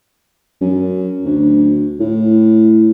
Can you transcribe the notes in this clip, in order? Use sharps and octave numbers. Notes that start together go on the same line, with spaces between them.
F#2
D2
A2